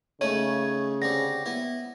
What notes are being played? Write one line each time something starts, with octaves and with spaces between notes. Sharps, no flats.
C#3 A3 C#4 D#4 C#5
D3 C4 G4 A#6
B3 E4